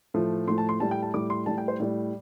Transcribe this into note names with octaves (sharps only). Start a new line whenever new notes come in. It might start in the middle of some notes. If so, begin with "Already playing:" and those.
A2 F3 A3
A2 F3 A3 C6
A5
C6
A2 G3 A5
G5
A5
A2 G3 D6
C6
A2 G3 A5
G5
C5
A2 G3 D5